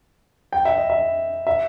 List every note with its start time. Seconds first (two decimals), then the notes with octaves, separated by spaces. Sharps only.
0.53 G5
0.65 E5
0.78 D#5
0.90 E5
1.47 E5